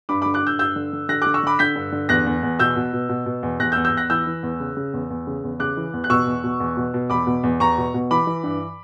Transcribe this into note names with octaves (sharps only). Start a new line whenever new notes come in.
G2 B5 D6
B5 D6
D3
D6 F#6
G2 E6 G6
G2 E6 G6
D3
D3
D3 F#6 A#6
D6 F#6
D3
C#6 E6
D3 B5 D6
D3 G6 B6
G2
D3
E2 F#6 A#6
E2
E2
B2 E6 G6
B2
B2
B2
B2
E2
E2 F#6 A#6
E6 G6
E2
E6 G6
E2 F#6 A#6
E3 E6 G6
E3
E2
C#3
C#3
E2
E2
C#3
E2
C#3 D6 F#6
E3
E2
F#6
B2 C#6 E6
E2
B2
E2
B2
B2
E2 B5 D6
B2
E2
E2 A#5 C#6
B2
B2
E3 B5 D6
E3
G2